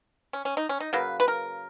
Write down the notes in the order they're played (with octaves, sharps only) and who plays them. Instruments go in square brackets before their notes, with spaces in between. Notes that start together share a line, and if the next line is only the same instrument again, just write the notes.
[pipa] C#4
C#4
D#4
C#4
D#4
C#3 F#3 A#3 B4
B4
A#4